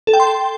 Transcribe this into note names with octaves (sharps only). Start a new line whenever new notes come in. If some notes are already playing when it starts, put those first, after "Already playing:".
A4
G5
C6